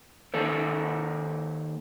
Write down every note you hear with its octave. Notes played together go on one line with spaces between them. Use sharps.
D#3 A#3 A4 C5